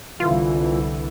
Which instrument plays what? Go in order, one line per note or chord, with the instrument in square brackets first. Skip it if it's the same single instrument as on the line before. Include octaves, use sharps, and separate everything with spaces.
[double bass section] C2 D3 E3 [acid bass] F4